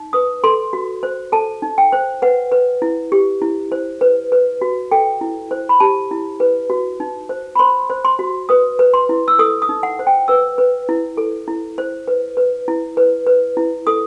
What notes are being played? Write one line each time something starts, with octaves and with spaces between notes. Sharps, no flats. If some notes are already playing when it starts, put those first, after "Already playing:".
Already playing: D#4
B4 D#6
A4 C6
F#4
C5
A4 A5
D#4
G5
C5
B4 F#5
B4
E4
G4
E4
C5
B4
B4
F#4
A4 G5
E4
C5
B5
G4 A5
E4
B4
F#4
D#4
C5
B5
C5 C6
C5
C6
F#4
B4 D#6
B4
C6
E4
E6
A4 D#6
D#6
D#4
F#5
C5
G5
B4 E6
B4
E4
A4
E4
C5
B4
B4
E4
B4
B4
E4
A4 D#6